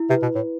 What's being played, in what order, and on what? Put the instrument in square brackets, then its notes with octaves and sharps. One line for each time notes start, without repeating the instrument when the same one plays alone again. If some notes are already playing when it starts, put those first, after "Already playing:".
Already playing: [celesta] E4
[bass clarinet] C3 [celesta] B4
[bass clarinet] B2
A2